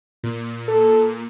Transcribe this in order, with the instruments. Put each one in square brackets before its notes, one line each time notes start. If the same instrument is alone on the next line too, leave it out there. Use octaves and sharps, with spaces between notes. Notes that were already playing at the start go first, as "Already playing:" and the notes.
[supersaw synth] A#2
[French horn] A4